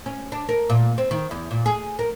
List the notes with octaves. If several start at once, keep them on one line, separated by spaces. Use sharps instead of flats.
C#4
D4
A#4
A#2
C4
D#3
E2
A#2
G#4
A#4